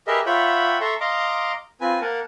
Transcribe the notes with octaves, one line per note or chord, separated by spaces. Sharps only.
G4 G#4 A#4 B4 D#5 E5
F4 C#5 E5 F#5 G5 B5
A4 E5 A#5 C6 C#6
D#5 F5 A#5 C6 D6
C4 F4 B4 G#5
A#3 A#4 F#5 A5